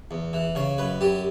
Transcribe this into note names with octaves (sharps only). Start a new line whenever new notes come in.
E2
E3
C#3 C#5
F#2 B4
F#2 G4